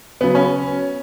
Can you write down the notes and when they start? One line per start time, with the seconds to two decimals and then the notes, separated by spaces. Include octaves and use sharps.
0.21 C#3 F#3 B3
0.35 C#4